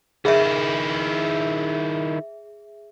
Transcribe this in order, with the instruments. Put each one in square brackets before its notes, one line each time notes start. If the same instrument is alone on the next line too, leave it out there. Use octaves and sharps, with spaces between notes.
[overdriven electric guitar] D#3 E4 [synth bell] G#4 E5